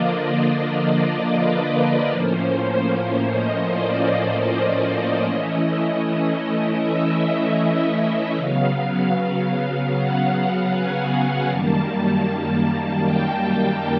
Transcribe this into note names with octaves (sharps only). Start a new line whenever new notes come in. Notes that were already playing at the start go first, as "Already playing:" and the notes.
Already playing: D3 F3 A#3 D4 F4 D5 D#5
D5
D5
B4
A2 F3 A#3 C#4 C5
D#5
D5
D#5
E3 A3 C#4 E4 D#5
E5
C#3 F#3 B3 F5
F#5
G#5
F#2 D#3 G3 A#3 A5
G5